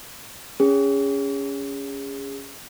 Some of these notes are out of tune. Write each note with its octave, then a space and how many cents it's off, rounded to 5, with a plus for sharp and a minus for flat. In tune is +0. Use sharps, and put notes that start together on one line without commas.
C#4 +15 G#4 -25